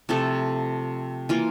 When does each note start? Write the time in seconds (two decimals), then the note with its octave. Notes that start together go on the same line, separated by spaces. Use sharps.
0.09 C3 F3 A3 A4
1.29 E3 A#3 F4